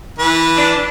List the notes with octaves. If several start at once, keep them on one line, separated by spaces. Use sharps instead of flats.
E3 B4
D4